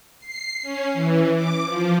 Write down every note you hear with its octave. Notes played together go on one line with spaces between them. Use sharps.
C7
C#4
E3
D6
F3